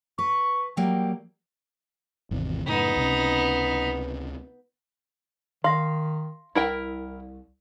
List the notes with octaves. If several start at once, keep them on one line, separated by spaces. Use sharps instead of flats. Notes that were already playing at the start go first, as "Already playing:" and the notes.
B4 C#6
F#3 G3 A#3 G5
G#1 E2 C3
F#2 A2 C#3 B3 D#4
C#2 C3 C#4
D#3 F5 C6 A#6
C2 E4 A#4 G5